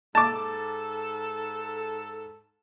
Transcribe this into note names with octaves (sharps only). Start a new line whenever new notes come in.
G#2 A4 A5 D6